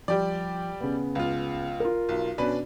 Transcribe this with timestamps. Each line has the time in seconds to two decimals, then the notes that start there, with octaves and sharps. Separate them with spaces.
0.08 F3 G3 G4 D5
0.81 C#3 B3
1.15 C#2 F4
1.80 F4 A#4
2.09 B1
2.38 B2 C#4 D4 B4